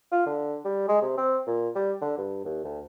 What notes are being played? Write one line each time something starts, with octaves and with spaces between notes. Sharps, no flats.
F4
D3
G3
G#3
C3
C4
A#2
G3
D3
G2
D#2
D2